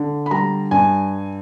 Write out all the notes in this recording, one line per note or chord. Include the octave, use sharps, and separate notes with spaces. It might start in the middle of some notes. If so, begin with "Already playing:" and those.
Already playing: D3
B5
G3 A#5
G2 G#5